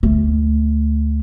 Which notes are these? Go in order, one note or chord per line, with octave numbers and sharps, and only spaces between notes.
D2 A3